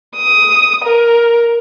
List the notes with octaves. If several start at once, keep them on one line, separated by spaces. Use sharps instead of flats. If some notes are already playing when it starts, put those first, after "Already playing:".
D#6
A#4